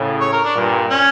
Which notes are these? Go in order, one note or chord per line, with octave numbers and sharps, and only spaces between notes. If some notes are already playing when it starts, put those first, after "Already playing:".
Already playing: A2 C#3
C#5
A#4
D4
G2 A#2
C#4